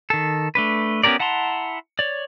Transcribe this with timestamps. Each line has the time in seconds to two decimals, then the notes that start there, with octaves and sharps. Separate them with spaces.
0.10 D#3 A4
0.55 A3 D4 B4
1.04 B3 C#4 G4 A#4 D5
1.20 E4 F#5 A5 A#5 C6
1.99 C#5 D5